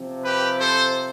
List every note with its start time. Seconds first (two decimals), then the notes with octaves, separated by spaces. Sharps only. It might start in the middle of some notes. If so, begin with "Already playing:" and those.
Already playing: C3 F3 C4
0.25 G4 B4
0.60 A4 C5